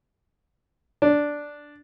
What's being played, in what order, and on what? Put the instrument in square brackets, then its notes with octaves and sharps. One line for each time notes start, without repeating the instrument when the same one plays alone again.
[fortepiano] D4